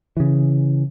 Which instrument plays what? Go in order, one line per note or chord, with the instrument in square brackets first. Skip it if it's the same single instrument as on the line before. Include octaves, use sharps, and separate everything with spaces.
[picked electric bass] C#3 E3